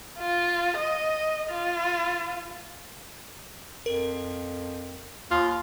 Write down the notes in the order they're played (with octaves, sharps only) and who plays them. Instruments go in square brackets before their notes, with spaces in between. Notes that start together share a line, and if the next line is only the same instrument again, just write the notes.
[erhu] F4
D#5
F4
[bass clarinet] F2 [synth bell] A#4
[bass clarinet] D#2 [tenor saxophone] F4